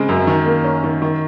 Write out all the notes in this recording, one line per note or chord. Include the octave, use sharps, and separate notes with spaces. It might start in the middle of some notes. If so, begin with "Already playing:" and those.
Already playing: C#3 G#3 C4
F#2
D#3
A#3
C#4
D#3
D#3